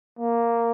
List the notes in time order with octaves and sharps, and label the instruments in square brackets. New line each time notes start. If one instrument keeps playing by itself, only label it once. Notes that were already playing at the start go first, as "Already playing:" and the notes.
[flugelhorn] A#3